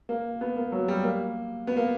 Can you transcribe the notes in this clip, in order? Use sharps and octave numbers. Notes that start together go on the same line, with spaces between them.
A#3
B3
A#3
F#3
G3
A#3
B3
A#3